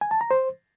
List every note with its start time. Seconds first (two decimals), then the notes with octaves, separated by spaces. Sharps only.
0.01 G#5
0.11 A5
0.21 A#5
0.31 C5